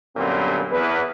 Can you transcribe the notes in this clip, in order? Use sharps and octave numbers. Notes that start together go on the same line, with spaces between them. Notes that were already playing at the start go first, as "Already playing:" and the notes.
F#2 A#2 D3 G3 B3 C4
E2 B4